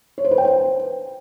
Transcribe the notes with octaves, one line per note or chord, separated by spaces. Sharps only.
C#5
C5
B4
G5
C5